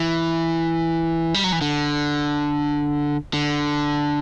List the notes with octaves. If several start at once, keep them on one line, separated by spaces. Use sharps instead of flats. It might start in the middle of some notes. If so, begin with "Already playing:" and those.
Already playing: E3
G3
F#3
E3
D3
D3